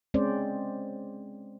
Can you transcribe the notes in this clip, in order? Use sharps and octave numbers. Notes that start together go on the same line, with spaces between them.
G#3 C4 C#4 C5 D5